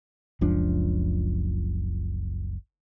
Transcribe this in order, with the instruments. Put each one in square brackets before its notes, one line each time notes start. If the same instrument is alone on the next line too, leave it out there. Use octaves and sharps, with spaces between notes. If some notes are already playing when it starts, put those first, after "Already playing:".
[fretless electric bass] F#1 C#2 F3 D4